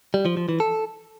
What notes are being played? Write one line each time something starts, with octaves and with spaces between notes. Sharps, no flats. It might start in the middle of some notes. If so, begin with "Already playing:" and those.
G3
F3
F3
E3
A4